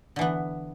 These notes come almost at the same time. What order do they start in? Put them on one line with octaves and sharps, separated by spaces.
D3 E3 B3